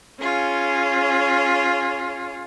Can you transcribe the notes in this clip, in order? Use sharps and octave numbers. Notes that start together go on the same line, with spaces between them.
C#4 F4 G#4